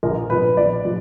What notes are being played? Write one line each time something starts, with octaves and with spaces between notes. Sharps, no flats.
A#1 A#4
A#2 F3 B3 B4
A#1 D5
A#2 F3